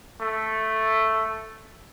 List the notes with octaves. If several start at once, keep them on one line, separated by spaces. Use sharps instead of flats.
A3